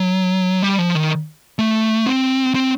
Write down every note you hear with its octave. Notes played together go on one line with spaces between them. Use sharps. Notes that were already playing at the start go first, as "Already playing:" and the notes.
Already playing: F#3
G3
F3
D#3
A3
C4
C4